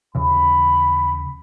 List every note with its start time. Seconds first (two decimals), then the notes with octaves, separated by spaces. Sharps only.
0.15 D#2 C#3 E3 B5